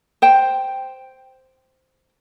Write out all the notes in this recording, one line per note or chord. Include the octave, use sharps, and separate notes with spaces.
C5 G5